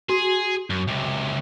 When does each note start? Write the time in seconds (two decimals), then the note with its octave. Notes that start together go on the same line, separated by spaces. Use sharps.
0.09 F#4 G#4
0.70 F#2
0.88 C#2 C3